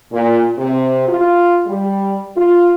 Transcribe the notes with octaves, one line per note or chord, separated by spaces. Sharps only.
A#2
C3
F4
G3
F4